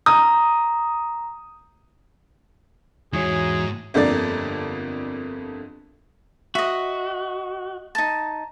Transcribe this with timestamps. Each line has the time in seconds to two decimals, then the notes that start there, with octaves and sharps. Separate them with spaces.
0.06 A#5 D#6
3.13 E2 G#2 F#4 G#4 C#5
3.94 G1 F2 D3 A#3 D5 A6
6.55 F#4 D#5 E5
7.95 D#4 A5